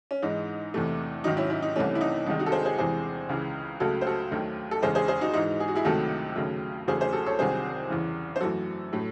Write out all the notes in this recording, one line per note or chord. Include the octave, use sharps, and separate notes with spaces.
C#4
G#2 E3 G#3 D#4
E2 C3 E3 A3
G#2 D#3 F#3 D#4
C#4 E4
C#4 E4
D#4
C2 C3 E3 A3 C#4
E4
D#4
C2 C3 D#3 G#3 D#4
D#4 F#4
A4
G#4 C5
G#4 C5
E2 C3 E3 G#3 G#4 C5
C#2 C#3 E3
C#2 C#3 F#3 A3 F#4 A4
C5
F#4 A4
D#2 D#3 F#3 A3
A4
E2 C#3 G#3 G#4 C5
G#4 C5
G#4 C5
D#4 F#4
G#2 E3 G#3 D#4 F#4
G#4
F#4
E4 G#4
C#2 C3 D#3 F#3 A3 F#4 A4
D#2 C#3 F#3 A3
E2 C#3 F#3 A3 G#4 C5
G#4 C5
F#4 A4
A4 C#5
C2 C3 D#3 F#3 G#4 C5
E2 C#3 E3
C5
F#2 E3 A3 F#4 A4
A2 F#3 A3